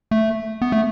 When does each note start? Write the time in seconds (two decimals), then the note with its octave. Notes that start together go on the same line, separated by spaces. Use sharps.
0.11 A3
0.62 B3
0.72 A3